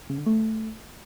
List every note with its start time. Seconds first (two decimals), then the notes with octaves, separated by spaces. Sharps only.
0.10 C#3
0.18 D3
0.26 A3